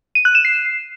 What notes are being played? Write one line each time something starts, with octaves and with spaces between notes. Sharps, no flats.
D#7
F#6
E7
C7